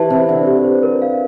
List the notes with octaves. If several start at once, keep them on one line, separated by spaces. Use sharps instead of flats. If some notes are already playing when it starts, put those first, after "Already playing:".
Already playing: E3 G4 A5
C3 C5
D3 E5
G4
C5
A#4
F5